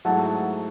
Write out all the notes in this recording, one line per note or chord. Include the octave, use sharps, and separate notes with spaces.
G#2 F#3 A3 E4 F#5 A5